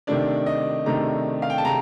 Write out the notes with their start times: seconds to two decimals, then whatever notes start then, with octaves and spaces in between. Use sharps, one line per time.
0.07 C3 D#3 A3 D4 D5
0.46 D#5
0.86 C3 D#3 A3 D4 A#5
1.42 F5
1.50 G5
1.58 A5
1.65 C3 A#5